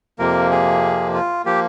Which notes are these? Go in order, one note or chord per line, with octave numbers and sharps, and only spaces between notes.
F2 C3 F3 A#3 A#4
G#4
F4
F3 A#3 G4